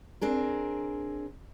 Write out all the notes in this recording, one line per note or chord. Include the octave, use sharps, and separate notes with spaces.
C4 D4 G#4 A#4